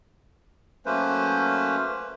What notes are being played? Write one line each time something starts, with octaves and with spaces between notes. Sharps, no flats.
F#3 A3 A#3 C#4 B4 C5